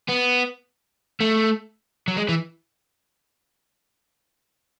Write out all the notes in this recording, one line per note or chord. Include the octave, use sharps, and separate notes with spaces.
B3
A3
F#3
G#3
E3